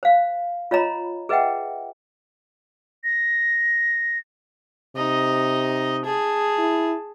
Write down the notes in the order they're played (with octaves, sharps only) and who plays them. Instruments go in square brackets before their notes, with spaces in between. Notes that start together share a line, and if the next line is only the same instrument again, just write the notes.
[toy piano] C5 F5
F4 C#5 D#5 A#5 B5
G#4 B4 D#5 E5 F#5 G5
[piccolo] A#6
[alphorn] C3 [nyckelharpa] D#4 D#5
[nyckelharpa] G#4 A5
[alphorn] E4